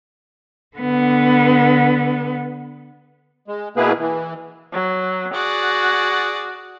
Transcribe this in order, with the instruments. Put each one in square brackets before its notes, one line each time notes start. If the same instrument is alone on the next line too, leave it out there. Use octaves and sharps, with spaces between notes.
[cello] D3 B3
[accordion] G#3
B2 A#3 B3 E4 G#4 B4
E3
[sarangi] F#3
[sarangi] F#4 [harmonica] G#4 D5 F#5